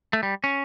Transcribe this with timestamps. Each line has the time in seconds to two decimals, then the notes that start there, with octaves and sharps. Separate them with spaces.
0.13 A3
0.23 G3
0.44 C#4